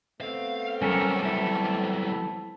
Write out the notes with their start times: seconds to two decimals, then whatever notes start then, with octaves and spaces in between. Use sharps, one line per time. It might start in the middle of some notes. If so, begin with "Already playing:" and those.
0.21 A3 B3 C4 F5
0.82 F#3 G3 C#4 A4 A#4
1.23 E4 A4